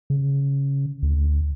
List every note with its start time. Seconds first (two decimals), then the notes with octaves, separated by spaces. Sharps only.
0.10 C#3
1.03 D2